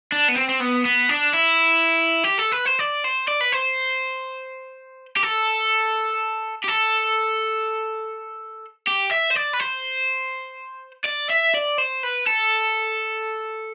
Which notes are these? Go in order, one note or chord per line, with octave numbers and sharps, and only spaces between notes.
D4
B3
C4
C4
B3
B3
D4
E4
G4
A4
B4
C5
D5
C5
D5
B4
C5
G4
A4
G4
A4
G4
E5
C5
D5
B4
C5
D5
E5
D5
C5
B4
A4